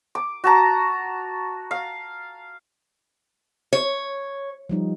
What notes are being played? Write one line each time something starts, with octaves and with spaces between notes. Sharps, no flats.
D6
F#4 A5 A#5
F5
C#5
F3 G3 D#4